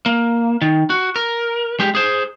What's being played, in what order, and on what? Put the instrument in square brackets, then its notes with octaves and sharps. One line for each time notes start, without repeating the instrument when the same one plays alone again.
[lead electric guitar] A#3
D#3
F#4
A#4
G#3 G4
G#4 C5